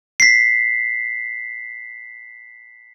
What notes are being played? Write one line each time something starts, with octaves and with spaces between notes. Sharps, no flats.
B6 C7